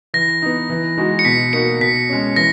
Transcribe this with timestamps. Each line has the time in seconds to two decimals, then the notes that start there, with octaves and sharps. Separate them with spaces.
0.14 E3 A#6
0.42 B3 D#4
0.70 E3
0.97 G#3 D#4 F#4
1.19 C#7
1.25 B2 B6
1.53 A#3 D#4 F#4 C#7
1.81 B2 B6
2.10 G#3 C#4
2.36 E3 A#6